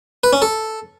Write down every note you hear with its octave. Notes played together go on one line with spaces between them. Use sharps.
B4
C#4
A4